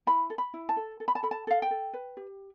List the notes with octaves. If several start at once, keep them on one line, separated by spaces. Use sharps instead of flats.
E4 B5
A4
B5
E4
A5
A4
A4
B5
A5
A4 B5
A5
A4 F5
G5
A4
B4
G4